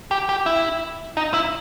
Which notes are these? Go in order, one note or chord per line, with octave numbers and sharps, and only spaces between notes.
G4
G4
E4
D#4
E4